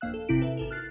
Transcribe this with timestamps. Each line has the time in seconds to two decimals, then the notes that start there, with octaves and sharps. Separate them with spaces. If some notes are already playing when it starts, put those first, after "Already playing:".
0.01 G1 F2 A#3 F5 E6 F#6
0.14 A4
0.29 G#1 C3 C4 E4 D7
0.41 A4 B4 E5
0.57 G#1 A4 A#4
0.71 F6 F#6 A6 C7